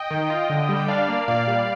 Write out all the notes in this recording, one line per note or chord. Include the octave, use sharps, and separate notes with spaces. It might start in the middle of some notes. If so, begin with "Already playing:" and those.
Already playing: D#5 G5
D#3
F4
D3
G3
G5
D4 D5 F5
A#3
A#2 D5 F5
G3